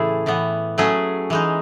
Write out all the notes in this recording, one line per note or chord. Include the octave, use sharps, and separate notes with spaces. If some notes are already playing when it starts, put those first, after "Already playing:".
Already playing: A2 C#3 E3 A3 E4 G#4
A2 E3 B3
F#3 A3 C#4 G#4
E3 G#3 D#4